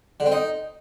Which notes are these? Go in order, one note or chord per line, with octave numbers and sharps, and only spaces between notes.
D3
C4
D#4